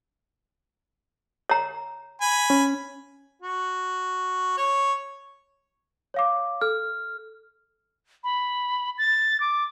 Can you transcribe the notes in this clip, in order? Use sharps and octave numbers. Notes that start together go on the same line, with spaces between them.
C#5 A#5
G#5 B5
C#4
F#4
C#5
C#5 F5 D6
A4 F6
B5
A6
D6